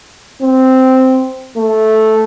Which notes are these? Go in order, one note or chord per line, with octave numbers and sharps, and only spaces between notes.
C4
A3